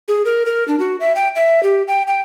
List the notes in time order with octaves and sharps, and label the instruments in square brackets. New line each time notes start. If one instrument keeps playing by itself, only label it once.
[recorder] G#4
A#4
A#4
D4
F#4
E5
G5
E5
G4
G5
G5